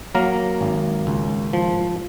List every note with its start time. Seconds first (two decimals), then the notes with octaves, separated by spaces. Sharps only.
0.15 F#3 A#3 A#4
0.61 G#1
1.07 C#2
1.53 F3